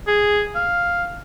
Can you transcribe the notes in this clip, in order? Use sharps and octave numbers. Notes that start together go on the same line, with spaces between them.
G#4
F5